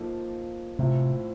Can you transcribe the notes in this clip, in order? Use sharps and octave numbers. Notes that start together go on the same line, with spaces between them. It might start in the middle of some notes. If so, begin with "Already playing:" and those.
Already playing: F3 A#3 D#4 A4
A2 C3 F3 C4